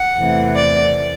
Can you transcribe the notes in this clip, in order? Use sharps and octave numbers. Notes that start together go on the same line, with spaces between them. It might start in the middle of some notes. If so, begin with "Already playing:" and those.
Already playing: F#5
E2 C3 E3 A3
D5